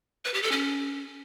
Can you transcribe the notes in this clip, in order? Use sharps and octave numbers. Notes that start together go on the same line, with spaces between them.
B4
G4
A4
C#4